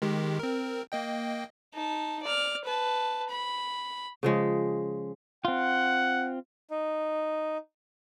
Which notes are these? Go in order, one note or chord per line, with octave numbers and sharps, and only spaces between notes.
D#3 G#3 G4
C4 A#4
A#3 D#5 G5
D#4 A5
D5 F6
B4 A5
B5
C#3 F3 G#3
C4 F4 F#5
D#4